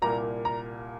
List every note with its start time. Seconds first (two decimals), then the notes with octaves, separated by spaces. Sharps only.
0.02 C2 A#2 G3 A#3 A#5
0.45 A#5